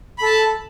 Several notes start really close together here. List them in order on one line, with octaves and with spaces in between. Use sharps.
B5 A4 A5